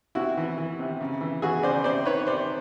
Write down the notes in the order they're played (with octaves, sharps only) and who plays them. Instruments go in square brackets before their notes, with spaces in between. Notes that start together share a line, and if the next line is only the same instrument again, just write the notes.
[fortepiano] C3 E4 F#4
E3
E3
C3
C#3
E3
E3 F#4 G#4
C#3 C5 D5
C3 C5 D5
D#3 B4 C#5
C3 C5 D5